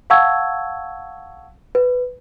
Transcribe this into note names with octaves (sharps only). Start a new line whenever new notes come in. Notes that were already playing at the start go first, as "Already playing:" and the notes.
F5 F#5 A5 C#6 E6 G#6
B4